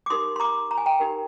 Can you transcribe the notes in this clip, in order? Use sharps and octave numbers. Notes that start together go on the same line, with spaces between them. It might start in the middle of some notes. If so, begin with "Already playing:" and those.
D6
D#4 G4 A#4 C6 D#6
C6
A#5 D6
A#5
G#5
G5 A#5
D#4 G4 A#4